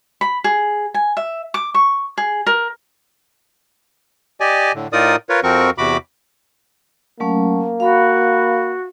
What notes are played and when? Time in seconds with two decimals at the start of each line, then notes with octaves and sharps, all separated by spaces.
0.21 B5
0.44 G#4
0.94 G#5
1.17 E5
1.54 D6
1.74 C#6
2.18 G#4
2.46 A#4
4.40 G4 D5 D#5 G#5
4.74 A2 D3
4.93 A2 D#4 F4 A#4 D5 D#6
5.29 F4 A#4 B4 C#5
5.43 F2 F3 C4 F#4 A#4 C#6
5.78 E2 C3 F#4 B5 D6
7.20 F#3 A3 A#3 C#4
7.80 F#4 F5 B5